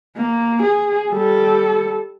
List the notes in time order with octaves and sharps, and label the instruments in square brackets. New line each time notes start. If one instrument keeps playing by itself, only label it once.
[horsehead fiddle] A#3
G#4
G3 A4